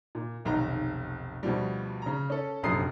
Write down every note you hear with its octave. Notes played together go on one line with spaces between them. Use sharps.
A#2
F1 B1 D#3 A#5
D2 B2 F3 G3
C#3 A#5
C#4 A4
F1 A#1 F#2 A4 D#6 C7